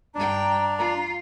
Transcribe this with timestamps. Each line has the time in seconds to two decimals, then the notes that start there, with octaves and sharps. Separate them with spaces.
0.15 G2 D4 G5 A#5
0.79 F4